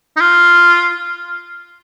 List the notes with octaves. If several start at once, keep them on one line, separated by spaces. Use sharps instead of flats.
D#4
F4